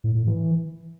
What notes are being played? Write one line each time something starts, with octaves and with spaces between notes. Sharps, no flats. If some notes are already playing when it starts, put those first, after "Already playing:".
A2
A2
E3